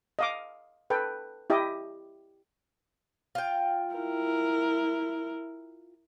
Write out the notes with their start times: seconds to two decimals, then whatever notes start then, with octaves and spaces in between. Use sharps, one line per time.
0.19 D#5 F5 D6
0.90 A4 B4 G5
1.50 E4 G4 D#5 D6
3.35 F4 G5
3.95 E4 A#4